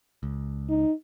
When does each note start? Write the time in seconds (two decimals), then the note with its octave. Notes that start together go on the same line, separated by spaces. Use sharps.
0.23 C#2
0.69 D#4